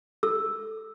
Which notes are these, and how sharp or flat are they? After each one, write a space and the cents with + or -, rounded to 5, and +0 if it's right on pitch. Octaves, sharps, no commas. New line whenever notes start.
A4 +0 E6 +0